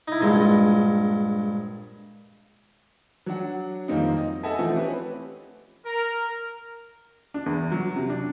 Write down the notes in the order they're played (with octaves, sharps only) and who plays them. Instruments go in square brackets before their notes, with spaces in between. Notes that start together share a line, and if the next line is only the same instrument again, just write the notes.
[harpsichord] D#4 E4
A#1 G2 G#3
[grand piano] F#3 D4 F#5
F2 D#3 G3 A#3 C4 D#4
D#5
A4 D#5 E5 F#5 G#5 A5
E3 F3 A3 C4
C4 C#4 G4 B4
[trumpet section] A#4
[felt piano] D4
E2
F#3
C3
D4